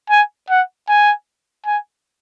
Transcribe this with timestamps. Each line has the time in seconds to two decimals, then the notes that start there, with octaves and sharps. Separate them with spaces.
0.10 G#5
0.50 F#5
0.89 G#5
1.66 G#5